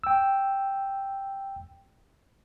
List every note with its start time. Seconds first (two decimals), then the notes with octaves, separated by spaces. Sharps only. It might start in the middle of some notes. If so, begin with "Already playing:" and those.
0.04 G5 E6